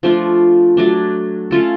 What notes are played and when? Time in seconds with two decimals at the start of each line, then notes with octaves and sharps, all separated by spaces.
0.03 F3 A3 D4 F4
0.77 F#3 A3 D4
1.51 A3 C#4 F4 A4